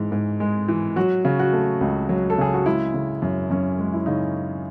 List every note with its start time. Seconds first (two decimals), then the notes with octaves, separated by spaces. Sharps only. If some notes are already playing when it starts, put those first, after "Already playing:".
Already playing: G#2 E3
0.12 G#2
0.40 G#3
0.68 E3
0.96 F#3 F#4
1.25 C#3
1.39 F#4
1.53 A3
1.81 C#2
2.09 F#3
2.30 A4
2.38 C#3 G#4
2.54 F#4
2.65 G#3 E4
2.94 C#3
3.22 F#2
3.50 F#2 C#4
3.79 G#3
3.93 E4
4.06 C#3 D#4